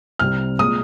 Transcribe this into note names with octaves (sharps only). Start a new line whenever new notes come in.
C2 C3 G3 C4 F6
A#2 G#3 D#6